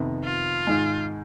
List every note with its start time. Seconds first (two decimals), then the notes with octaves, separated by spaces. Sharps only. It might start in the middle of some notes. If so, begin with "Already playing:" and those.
Already playing: F2 C3 D#3 B3
0.24 F4
0.67 G#2 D#3 G#3